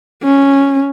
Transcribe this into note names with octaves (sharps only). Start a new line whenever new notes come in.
C#4